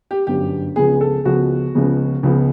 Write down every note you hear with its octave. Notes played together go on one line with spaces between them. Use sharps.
G4
G1 F#2 D3 G4
C#2 C#3 F3 G#3 B3 G#4
A4
C#2 C#3 F3 G#3 B3 F#4
C#2 C#3 F3 G#3 B3
C#2 C#3 F3 G#3 B3